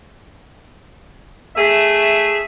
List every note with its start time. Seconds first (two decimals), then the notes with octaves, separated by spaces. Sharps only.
1.57 A3 G#4 E5